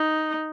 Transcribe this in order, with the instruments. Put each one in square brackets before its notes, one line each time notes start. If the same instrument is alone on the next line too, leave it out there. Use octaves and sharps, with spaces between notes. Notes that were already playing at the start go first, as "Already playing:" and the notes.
Already playing: [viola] D#4